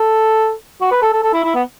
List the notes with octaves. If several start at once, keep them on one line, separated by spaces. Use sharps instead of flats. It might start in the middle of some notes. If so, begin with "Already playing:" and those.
Already playing: A4
F#4
B4
A4
A4
A4
E4
E4
B3